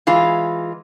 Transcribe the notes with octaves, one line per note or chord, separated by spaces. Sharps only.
E3 G#3 F4